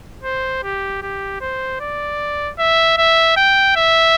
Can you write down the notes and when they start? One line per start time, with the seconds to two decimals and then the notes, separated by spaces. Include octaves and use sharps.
0.23 C5
0.63 G4
1.02 G4
1.41 C5
1.80 D5
2.59 E5
2.98 E5
3.37 G5
3.76 E5